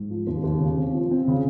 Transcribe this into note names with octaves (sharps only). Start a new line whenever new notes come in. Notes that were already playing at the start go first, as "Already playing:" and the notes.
Already playing: G#2
F3
D#2
D#2
C#3
C4
F3
C4
C#3